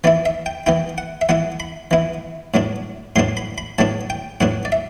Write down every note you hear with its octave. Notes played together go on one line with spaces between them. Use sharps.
E3 B3 E4 D5
E5
G5
E3 B3 E4 G5
F#5
E5
E3 B3 E4 F#5
B5
E3 B3 E4
A2 F#3 B3 D4
A2 F#3 B3 D4 C6
B5
B5
A2 F#3 B3 D4 A5
G5
A2 F#3 B3 D4 F#5
D5
E5